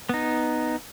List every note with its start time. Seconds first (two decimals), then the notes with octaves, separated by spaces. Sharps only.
0.09 B3 D#4